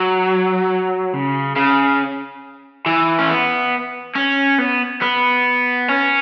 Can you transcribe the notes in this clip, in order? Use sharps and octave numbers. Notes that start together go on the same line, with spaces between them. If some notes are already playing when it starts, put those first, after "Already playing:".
Already playing: F#3
C#3
C#3
E3
C#4
B3
C#4
B3
B3
C#4